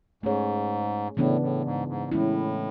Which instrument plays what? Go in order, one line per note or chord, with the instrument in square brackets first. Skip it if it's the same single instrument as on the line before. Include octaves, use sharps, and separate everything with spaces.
[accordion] G#2 [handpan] A3 C#4 G#4 C#5
[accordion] A2 [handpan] C#3 E3 B3 D4
[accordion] A2
G#2
G#2
[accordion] A2 [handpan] E3 G#3 C#4 E4